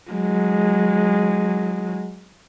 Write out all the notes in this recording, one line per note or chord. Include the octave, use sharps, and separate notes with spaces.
F#3 G#3